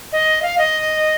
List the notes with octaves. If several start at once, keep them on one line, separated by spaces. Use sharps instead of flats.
D#5
F5
D#5